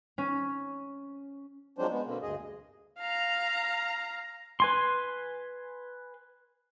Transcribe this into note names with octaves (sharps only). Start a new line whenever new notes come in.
C#4
F3 F#3 G#3 C4 D4 C5
G#3 B3
B2 D3 A#3 C4
D2 G2 G#4 D#5
F5 A#5
B4 G#5 C6